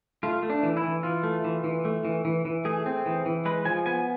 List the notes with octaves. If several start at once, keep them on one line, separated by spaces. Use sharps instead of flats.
A3 F4
A3
D4
E3
E4
E3
E3 F4
A3
E3
E3
A3
E3
E3
E3
A3 G#4
C4
E3
E3
G#3 B4
F3 G#5
B3 G#5